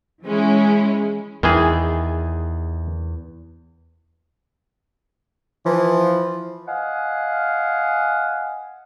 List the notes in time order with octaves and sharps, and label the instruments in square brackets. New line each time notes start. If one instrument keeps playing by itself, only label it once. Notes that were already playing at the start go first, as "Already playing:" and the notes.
[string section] E3 G#3 C#4 E4
[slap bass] E2 [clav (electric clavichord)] D#3 E3 G#4
[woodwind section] E3 F3
D#5 F5 F#5 G#5